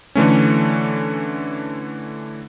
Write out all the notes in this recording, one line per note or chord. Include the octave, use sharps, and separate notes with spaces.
D3 E3 A3 C#4